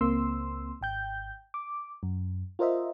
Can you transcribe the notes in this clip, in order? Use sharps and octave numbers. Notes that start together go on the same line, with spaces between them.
C#2 A#3 C4 C6 E6
G#1 G5 G6
D6
F#2
F4 A#4 C5 D#5 E5